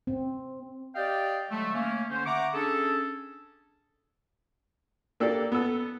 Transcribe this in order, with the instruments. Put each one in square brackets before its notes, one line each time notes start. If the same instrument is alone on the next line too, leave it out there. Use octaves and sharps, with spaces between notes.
[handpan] C4
[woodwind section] G4 D5 D#5 F5 G5
D3 F#3 G#3 A3
A3 A#3 C#4
D3 C#4 C5
E5 F#5 A#5 C#6 D6
C#4 D4 G#4 A4
[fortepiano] A#3 D4 G4 A4 D5
B3 A4